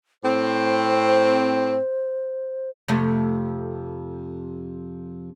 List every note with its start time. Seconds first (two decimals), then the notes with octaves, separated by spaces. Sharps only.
0.24 A2 C4 C5
2.88 F2 C3 A3